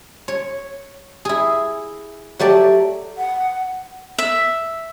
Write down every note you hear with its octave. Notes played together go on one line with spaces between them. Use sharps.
C#5
E4 G#4
F#3 A3 G4 D5
F#5
E5